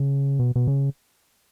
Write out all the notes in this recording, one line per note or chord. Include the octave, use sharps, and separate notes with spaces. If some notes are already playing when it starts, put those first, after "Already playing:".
Already playing: C#3
B2
B2
C#3